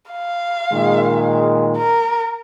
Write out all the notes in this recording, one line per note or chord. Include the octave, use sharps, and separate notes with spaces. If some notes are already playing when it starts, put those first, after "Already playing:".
F5
A#2 D#3 G#3
A#4